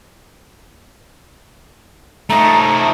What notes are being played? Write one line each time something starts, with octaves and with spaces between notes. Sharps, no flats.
A3 D#4 A#5